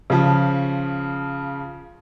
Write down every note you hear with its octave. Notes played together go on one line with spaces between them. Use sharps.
C#3 F3 A5